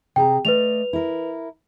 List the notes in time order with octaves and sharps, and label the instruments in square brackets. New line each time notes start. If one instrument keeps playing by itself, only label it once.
[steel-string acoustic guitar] C3 G#4 A#5 [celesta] G5
[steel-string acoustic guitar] A3 D5 D#5 [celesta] B4 F7
[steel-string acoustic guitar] E4 A#4